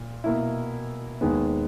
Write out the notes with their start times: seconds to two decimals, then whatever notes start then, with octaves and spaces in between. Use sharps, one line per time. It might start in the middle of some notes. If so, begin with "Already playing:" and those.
Already playing: A#2
0.24 B2 A#3 E4
1.21 D#2 D#3 G#3 B3